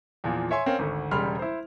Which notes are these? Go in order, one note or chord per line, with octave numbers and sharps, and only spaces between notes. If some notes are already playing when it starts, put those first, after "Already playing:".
E2 A#2 F3
C#5 E5 G#5 C6
C4 C#4 A#4 F5
G#1 D2
E1 C#3 G3 B5 C6 F6
E4 C5